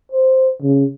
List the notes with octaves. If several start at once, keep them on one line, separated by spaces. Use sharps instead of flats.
C5
C#3